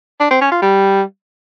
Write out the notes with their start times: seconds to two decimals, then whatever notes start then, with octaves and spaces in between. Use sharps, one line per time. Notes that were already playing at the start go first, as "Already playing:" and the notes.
0.20 D4
0.31 C4
0.41 C#4
0.52 F4
0.62 G3